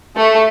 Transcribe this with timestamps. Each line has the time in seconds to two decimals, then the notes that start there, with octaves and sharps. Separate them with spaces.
0.17 A3